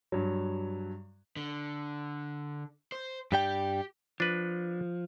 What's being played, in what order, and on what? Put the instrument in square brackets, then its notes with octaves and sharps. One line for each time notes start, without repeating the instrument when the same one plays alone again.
[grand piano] G2 F#3
[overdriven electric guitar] D3
C5
[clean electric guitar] G2 G3 G5 [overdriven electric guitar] G4
[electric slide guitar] F3 [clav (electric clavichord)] D4 B4